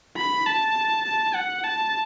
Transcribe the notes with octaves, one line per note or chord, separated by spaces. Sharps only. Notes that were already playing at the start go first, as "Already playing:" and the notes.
B5
A5
A5
F#5
A5